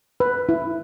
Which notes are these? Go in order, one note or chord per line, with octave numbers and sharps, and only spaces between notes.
B4
E4